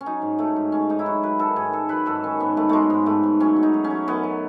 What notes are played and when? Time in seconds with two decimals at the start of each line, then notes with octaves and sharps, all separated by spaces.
0.01 C#4
0.06 F#3 D#4
0.22 G#2
0.39 F#3 A3
0.56 G#2
0.72 G#2 C#4
0.89 G#2 D#4
0.99 E4
1.06 F#3 F#4
1.23 F#3 B4
1.39 D#3 A4
1.56 G#2 G#4
1.73 D#3 A4
1.89 F#3 B4
2.06 G#2 A4
2.24 D#3 C#4
2.40 G#2 B3
2.57 G#2 A3
2.69 F#3 G#3 A3
2.90 G#2
3.06 G#2 A3
3.23 G#2
3.40 F#3 C#4
3.56 F#3
3.63 D#4
3.74 F#3
3.84 C#4
3.90 F#3
4.08 F#2 B3
4.23 F#3